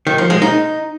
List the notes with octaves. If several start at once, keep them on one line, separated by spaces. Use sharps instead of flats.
D#3
F3
G#3
D#4